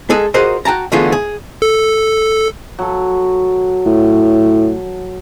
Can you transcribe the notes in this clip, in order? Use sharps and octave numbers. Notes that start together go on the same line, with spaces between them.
G#3 G#4 A4 D#5
F4 F#4 G#4 A#4 C5 D#5
F#4 G5 A5 A#5
D3 E3 A3 B3 F4 G#4
G#4
A4
F#3 A4
A2